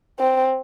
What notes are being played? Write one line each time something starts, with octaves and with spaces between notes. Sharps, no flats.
C4